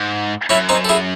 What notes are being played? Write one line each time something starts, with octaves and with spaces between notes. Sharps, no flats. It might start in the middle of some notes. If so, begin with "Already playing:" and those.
Already playing: G#2
F#2 C#4 E4
C4 D#4
A4
E4 G#4